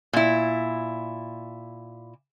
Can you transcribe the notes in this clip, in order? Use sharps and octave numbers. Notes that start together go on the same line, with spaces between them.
A#2 E4